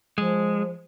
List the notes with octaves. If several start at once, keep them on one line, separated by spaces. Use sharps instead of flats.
F3 G#3